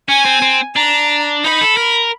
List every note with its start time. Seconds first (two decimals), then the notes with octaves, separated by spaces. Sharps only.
0.08 C#4 G#5
0.25 C4
0.42 C4
0.76 D4 A#5
1.44 D#4 B5
1.61 A4
1.77 A#4